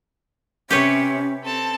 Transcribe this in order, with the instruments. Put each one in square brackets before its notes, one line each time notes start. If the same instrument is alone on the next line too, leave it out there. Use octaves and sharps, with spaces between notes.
[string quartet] C3 [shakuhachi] C#4 [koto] G4 B4 C#5
[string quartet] C4 A4 A5